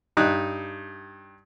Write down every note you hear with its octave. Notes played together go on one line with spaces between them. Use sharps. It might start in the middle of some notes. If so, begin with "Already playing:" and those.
G2 D#4 F#6